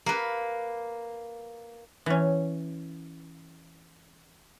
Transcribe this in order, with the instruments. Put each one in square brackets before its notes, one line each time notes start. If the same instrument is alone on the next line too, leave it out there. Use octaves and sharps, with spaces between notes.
[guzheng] A#3 B4
[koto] E3 C#4